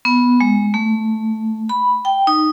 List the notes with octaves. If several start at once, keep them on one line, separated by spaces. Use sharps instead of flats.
B3
G#3
A3
B5
G5
D#4